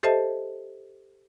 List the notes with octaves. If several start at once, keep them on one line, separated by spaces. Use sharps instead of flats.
G4 A4 C5 D#5 E5 A5